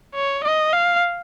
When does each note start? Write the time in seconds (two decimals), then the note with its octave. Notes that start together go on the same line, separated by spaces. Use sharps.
0.15 C#5
0.44 D#5
0.73 F5